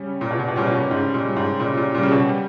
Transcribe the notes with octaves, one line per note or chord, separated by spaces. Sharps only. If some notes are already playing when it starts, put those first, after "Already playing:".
Already playing: C#3 G3 C#4
A#2 C#3
B2
A#2
B2
A#2 G3 C#4
B2
A#2
G#2 C#3
A#2
G3 C#4
G#2
A#2 C#3
A#2
A#2 G3 C#4
C#3
B2
G3